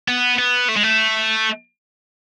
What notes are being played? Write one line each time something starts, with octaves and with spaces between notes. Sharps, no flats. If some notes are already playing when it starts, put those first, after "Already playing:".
B3
B3
A3
G#3
A3